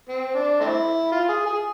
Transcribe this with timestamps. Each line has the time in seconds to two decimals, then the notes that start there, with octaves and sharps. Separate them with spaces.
0.09 C4
0.35 D4
0.60 A3 C4 E4
1.12 F4
1.29 G#4
1.46 G#4